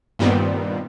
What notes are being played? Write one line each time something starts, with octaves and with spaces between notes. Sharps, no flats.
G2 A#2 D#3 G3 B3 C4